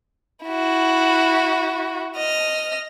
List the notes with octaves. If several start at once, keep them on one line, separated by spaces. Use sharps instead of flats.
E4 F#4
D#5 F6